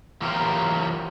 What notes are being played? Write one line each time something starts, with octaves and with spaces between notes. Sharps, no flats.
E3 F#3 F4 G4 A#4 C5